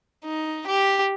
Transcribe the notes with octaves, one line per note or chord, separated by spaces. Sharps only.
D#4
G4